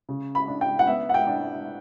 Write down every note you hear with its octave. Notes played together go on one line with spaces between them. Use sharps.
C#3
B5
D4
G5
F#5
B3 E5
F#5
G5
D4